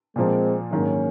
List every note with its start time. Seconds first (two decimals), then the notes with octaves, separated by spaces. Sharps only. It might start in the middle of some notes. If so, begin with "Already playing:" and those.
0.16 A#2 F3 G#3 A#3 C4
0.71 G#2 D#3 F#3 A#3 C#4